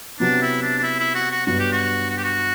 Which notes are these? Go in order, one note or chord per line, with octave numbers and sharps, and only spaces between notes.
C3 F#3 B3 D4
E4
D4
D4
E4
E4
F#4
F#4
G2 F#3 B3 F#4
G4
F#4
F#4
G4
F#4